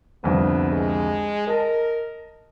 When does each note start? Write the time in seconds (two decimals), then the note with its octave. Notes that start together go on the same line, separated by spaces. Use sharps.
0.24 C2 F2 D3 B3
0.72 G#3
1.47 A#4 D#5 A5